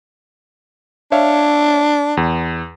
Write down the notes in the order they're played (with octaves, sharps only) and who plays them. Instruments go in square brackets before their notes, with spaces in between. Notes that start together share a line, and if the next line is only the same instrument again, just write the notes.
[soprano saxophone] D4 [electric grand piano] C#5 E5 F5
[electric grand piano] E2